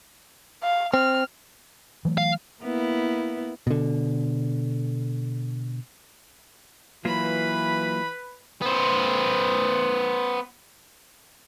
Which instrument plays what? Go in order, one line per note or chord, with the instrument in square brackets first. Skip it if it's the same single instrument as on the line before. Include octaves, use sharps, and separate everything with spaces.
[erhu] F5
[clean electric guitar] C4 [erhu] F6
[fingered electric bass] E3 F#3 A3
[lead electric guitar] F5
[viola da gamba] A#3 B3 E4
[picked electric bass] B2 D3
[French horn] E3 [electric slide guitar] F#3 A#3 F4 [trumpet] B4 [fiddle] B5
[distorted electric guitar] B3 C5